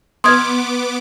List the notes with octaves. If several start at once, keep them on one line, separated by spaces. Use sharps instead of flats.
B3 B4 D#5 C6 D6 D#6 G#6